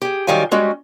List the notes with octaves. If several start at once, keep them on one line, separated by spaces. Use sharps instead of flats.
G4 G#4
D#3 F#3 G3 F4 G#5
G3 G#3 C#4 F#4